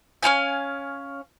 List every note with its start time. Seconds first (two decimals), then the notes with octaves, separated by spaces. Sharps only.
0.23 C#4 D#4 F5 G#5